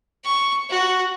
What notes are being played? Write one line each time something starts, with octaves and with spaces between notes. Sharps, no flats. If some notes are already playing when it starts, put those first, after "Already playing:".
C#6
F#4